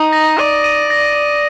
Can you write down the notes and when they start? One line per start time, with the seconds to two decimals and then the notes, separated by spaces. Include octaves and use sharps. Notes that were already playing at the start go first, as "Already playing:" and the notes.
Already playing: D#4 D#6
0.12 A#6
0.38 D5 D#7
0.64 D#7
0.90 A#6